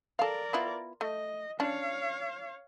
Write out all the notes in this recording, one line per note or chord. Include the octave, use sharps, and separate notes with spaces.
A4 A#4 D5 F5
B3 E4 F4
A3 D#5
C#4 D4 C#5 F5